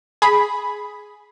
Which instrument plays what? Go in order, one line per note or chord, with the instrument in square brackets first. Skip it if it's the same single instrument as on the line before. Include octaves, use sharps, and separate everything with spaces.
[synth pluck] G#4 B5